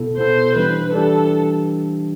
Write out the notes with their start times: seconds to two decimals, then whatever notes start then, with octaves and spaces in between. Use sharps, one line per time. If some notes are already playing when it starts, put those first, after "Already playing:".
Already playing: B2 B3 E4 A4
0.18 B2 B3 E4 A4 C5
0.55 E3 G3 D4 B4
0.93 E3 G3 D4 A4